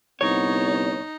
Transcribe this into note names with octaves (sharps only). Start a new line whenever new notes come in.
G1 C2 B3 D#4 C#5